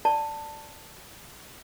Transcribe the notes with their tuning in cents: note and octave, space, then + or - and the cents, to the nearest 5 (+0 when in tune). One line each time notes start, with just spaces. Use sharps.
D5 +0 A5 +15